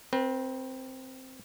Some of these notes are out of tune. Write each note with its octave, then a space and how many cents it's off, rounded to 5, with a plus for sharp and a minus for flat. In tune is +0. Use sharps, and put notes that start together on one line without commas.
C4 +0 B4 -40